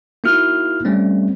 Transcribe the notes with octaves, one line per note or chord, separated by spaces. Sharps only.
A#3 D#4 E4 F#4 F6
G3 A3 C4 C#4